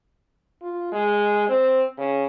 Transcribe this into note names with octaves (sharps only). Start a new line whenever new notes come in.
F4
G#3
C4
C#3